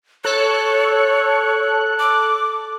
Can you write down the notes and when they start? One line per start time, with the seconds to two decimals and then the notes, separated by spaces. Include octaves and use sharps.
0.24 A4 C#5 F#6
1.99 D6